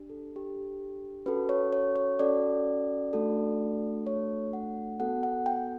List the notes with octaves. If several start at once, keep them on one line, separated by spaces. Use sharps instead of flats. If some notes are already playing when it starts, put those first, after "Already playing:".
Already playing: D4 G4
A4
D4 G4
C#4 F#4 A4 B4
C#5
C#5
C#5
C#4 F#4 A4 D5
A3 D4 F#4 A4
A3 D4 F#4 A4 C#5
F#5
B3 F#4 A4 F#5
F#5
G5